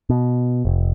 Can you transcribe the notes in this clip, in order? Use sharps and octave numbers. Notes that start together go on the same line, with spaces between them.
B2
F1